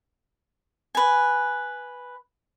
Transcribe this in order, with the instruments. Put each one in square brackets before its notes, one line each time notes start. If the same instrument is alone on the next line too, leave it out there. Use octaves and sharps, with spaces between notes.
[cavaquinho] B4 G#5